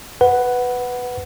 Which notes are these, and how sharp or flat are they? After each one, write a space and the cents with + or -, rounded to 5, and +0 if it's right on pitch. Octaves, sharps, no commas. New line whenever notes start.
B4 +5 F#5 +0